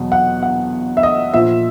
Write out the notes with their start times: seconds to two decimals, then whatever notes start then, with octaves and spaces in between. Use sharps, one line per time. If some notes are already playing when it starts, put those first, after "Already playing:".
Already playing: E2 B2 F#3
0.12 F#5
0.43 F#5
0.97 E5
1.03 D#5
1.34 A#2 F3 E5